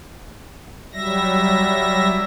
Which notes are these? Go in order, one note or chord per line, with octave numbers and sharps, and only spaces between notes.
F#3 G3 E5 A#6